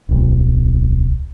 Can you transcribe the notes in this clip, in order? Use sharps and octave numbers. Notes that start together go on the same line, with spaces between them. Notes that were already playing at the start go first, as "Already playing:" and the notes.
D1 B1